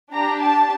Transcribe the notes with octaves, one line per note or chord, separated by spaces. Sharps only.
D4 G4 A#5
A5